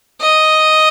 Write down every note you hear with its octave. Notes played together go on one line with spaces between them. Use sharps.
D#5